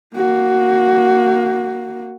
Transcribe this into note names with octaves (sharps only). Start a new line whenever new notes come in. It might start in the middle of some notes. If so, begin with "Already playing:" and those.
A#3 F#4